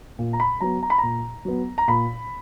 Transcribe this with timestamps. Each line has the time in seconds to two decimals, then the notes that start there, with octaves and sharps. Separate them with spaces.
0.19 A#2
0.33 A#5
0.40 B5
0.61 F#3 B3 A#5
0.83 A#5
0.90 B5
0.98 A#2 A#5
1.45 F#3 B3
1.78 A#5
1.88 A#2 B5